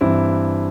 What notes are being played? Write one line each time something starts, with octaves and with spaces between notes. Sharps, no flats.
G2 E3 C4 E4